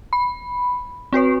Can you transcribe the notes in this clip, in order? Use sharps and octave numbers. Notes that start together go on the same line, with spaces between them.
B5
C4 F#4 B4 C#5